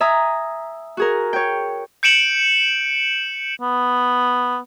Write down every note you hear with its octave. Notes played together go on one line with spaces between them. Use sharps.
E5 G#5 A#5 D#6
F#4 G#4 A#4
C#5 G5
G6 C#7 D7 E7 F#7
B3